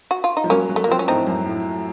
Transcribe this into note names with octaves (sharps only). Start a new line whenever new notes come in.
F#4
F4
D#4
F3
F#3 A#3 C#4
F#3
A3
A#3
F3 C4
C#4
A2 C4 D#4
F#2
A2